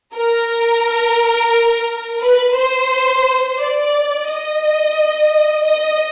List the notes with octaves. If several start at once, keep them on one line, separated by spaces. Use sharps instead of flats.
A#4
B4
C5
D5
D#5
D#5